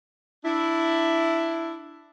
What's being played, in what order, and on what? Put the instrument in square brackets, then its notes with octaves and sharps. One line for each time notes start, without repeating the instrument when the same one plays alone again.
[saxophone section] D4 E4